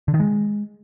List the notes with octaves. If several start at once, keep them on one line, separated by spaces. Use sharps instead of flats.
D3
D#3
G#3